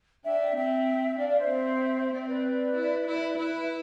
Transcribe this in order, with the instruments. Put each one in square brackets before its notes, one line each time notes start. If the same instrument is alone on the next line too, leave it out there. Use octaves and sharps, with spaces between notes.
[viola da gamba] D4 [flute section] E5 G5
[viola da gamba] C4 [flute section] E5 G5
[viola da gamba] D4 [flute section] D5 F5
[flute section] D5 F5
C5 E5
[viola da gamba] C4
[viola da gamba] C4 [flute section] D5
[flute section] E5
B4 D5
[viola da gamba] E4
E4
[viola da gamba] E4 [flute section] B4
[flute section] E5